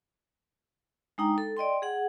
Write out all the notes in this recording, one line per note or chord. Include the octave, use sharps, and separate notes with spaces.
G#3 D4 D#4 G5 A#5
A4
D5 D#5 G5 C6
G#4 F#5